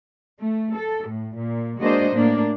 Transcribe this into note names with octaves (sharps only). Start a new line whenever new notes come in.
A3
A4
A2
A#2
G#3 A#3 D4 F#4 C5 D#5
A2 A#3 D4